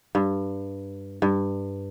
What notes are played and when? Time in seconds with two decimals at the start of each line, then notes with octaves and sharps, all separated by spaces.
0.15 G2
1.22 G2